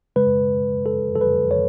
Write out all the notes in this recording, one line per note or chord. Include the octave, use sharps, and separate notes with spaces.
C#3 G#3 B4
A4
A4
B4
C#5